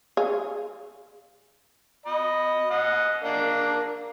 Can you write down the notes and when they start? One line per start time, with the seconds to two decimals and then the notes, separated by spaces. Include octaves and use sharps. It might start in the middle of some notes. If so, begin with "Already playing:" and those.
0.17 G#4 F5
2.06 D#5 B5
2.70 D#5 F#5
3.24 A#3 D4